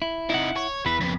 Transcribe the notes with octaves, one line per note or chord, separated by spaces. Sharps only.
E4
C3 D#4 E4 F#5
C#5
E2 E3 B4
F2 C#3 B3